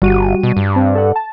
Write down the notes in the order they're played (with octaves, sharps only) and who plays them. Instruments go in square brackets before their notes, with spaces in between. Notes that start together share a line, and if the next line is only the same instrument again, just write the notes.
[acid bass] G1 [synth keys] G3 F#4 D#7
[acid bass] B2
G2
[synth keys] C4
A4 F#5
A5